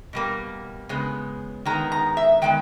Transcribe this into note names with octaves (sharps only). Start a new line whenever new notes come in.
B2 G3 A#3
C#3 G#3 B3
D#3 G#3 B3 A#5
A#5
E5
D#3 G#3 B3 G5